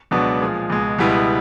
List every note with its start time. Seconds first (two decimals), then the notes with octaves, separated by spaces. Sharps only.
0.11 C#2 B2 F#3 B3 D4
0.41 A#2 F3 G#3
0.70 C#2 B2 G#3
0.98 C#2 B2 G3 B3 E4